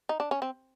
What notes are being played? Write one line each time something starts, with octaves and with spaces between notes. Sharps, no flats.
D#4
D4
C#4
C4